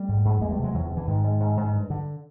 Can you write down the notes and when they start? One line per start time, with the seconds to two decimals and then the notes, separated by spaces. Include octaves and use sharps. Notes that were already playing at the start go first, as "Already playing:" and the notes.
Already playing: G3 A3
0.09 G#2
0.25 G#2
0.41 E2 G#3 A#3
0.52 G3 A3
0.58 C3
0.64 F#3 G#3
0.74 E2 E3 F#3
0.86 D#3 F3
0.91 C3
0.97 D3 E3
1.07 G#2 D#3
1.24 G#2
1.40 G#2
1.57 G#2
1.73 G2
1.90 D3